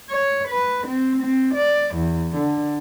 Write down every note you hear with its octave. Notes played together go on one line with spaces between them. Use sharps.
C#5
B4
C4
C4
D5
E2
D3